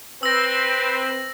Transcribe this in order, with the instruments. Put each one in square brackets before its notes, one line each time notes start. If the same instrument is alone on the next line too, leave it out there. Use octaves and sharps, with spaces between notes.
[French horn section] C4 B4 [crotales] E6 A#6